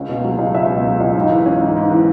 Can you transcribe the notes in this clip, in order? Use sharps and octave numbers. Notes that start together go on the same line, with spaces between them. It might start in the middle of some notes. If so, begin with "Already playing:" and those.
Already playing: C#2 C#4
B2
F#3
C#2
C#2 E5
B2
F#3
C#2
G#2
E3
C#4
G#2
G#2
E3